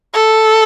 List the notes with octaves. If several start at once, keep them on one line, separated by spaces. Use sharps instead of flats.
A4